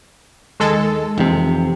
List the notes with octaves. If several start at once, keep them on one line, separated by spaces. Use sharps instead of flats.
D#2 D#3 G#3 A4
F1 C3 E3